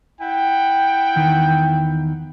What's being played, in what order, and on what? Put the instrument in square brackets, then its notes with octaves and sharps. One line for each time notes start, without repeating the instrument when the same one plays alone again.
[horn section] E4 F#5 G5
[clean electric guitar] E2 D#3 E3